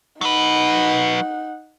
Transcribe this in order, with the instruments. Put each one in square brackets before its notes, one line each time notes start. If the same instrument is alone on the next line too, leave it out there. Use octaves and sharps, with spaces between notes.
[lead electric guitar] F#3 B4 [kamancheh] D#4 F#5